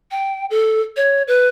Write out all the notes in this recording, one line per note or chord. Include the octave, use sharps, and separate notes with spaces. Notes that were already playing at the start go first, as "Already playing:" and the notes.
G5
A4
C#5
B4